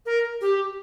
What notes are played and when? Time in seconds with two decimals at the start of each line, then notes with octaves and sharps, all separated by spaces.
0.06 A#4
0.41 G4